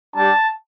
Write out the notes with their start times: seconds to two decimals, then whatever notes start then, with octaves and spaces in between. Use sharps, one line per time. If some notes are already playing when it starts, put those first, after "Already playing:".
0.16 G3 D4 G4 A5